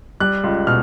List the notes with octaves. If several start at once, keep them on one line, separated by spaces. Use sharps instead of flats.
G3 F#6
C#2
B2 F6